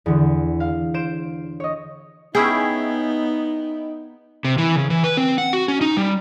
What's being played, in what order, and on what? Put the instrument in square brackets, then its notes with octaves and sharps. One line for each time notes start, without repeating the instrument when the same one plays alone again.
[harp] E2 D3
F5 F6
C5 D7 E7
C#5 D#5
[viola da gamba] B3 [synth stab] C#4 E4 G5 [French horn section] D#4 [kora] G#4
[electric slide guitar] C3
E3
C#3
E3
B4
C4
F#5
F#4
C#4
D#4
G3